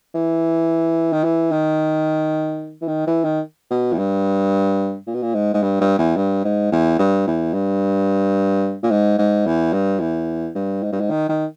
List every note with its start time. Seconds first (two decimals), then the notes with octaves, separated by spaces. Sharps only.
0.14 E3
1.12 D#3
1.24 E3
1.52 D#3
2.82 E3
2.88 D#3
3.07 E3
3.24 D#3
3.70 B2
3.93 E2
3.98 G2
5.07 A#2
5.14 B2
5.22 A#2
5.34 G#2
5.54 G#2
5.63 G2
5.81 G2
5.98 E2
6.16 G2
6.44 G#2
6.72 E2
6.99 G2
7.27 E2
7.53 G2
8.83 A#2
8.90 G#2
9.18 G#2
9.46 E2
9.73 G2
10.00 E2
10.55 G2
10.83 G#2
10.92 G2
11.00 G#2
11.10 D#3
11.29 D#3